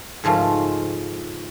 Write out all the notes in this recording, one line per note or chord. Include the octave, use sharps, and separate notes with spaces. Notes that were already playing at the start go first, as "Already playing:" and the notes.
G#2 C#3 F3 A3